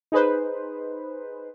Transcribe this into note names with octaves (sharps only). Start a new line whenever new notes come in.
D#4 G#4 B4 C5